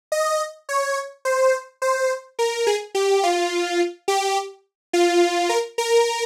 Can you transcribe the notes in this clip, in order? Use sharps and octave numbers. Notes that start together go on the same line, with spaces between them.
D#5
C#5
C5
C5
A#4
G#4
G4
F4
G4
F4
A#4
A#4